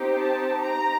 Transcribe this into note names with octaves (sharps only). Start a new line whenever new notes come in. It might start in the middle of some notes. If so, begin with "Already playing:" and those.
Already playing: C4 D#4 G4
A5
A#5